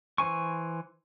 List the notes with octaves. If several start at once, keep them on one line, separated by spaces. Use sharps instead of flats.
E3 C5 G#5 C#6